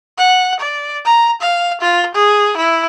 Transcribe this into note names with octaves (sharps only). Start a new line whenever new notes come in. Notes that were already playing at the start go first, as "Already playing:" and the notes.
F#5
D5
A#5
F5
F4
G#4
E4